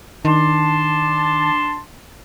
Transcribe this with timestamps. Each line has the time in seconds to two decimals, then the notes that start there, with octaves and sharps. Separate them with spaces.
0.25 D#3 D4 A5 C6